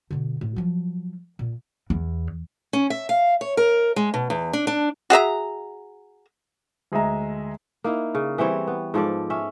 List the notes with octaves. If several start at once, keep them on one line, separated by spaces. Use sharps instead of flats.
B2 D3
A2
F3 F#3
A#2
E2
C#4
E5
F5
C#5
A#4
G#3
B2
E2
D4
D4
F#4 G#4 E5 A#5
D2 G#3 G#4 E5 A#5
A#3 D#4 E4
C#3
E3 G3 C4 C#5
B3
G#2 F3 A4 D5
C#4 E5